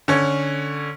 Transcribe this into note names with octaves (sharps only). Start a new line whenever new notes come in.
D3 C#4 C#5